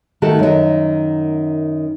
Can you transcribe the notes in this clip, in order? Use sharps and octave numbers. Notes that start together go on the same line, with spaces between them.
D#3 A3 F#4 A4
F#2 D#3